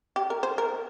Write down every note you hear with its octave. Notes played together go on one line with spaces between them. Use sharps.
G4
A#4
C5
A#4